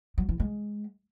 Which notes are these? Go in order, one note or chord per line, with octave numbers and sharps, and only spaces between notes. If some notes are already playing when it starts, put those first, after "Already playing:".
F#3
E3
G#3